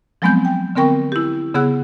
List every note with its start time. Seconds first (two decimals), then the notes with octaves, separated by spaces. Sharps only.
0.22 F3 F#3 G#3 B3 C4 G6
0.45 G5
0.75 D3 B3 C4 A#4 G5 C#6
1.12 E4 G4
1.54 C#3 B3 G#4 F#5 E6 F#6